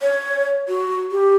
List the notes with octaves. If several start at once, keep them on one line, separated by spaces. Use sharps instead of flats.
C#5
F#4
G4